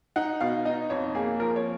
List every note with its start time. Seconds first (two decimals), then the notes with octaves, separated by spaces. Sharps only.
0.16 D#4 F#5
0.41 B2 F5
0.65 D#4 D#5
0.90 F2 C#5
1.15 A#3 G#4
1.39 F3 A#4
1.56 C#5